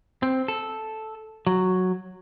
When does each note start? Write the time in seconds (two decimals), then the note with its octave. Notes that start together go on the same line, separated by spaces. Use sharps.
0.23 C4
0.48 A4
1.47 F#3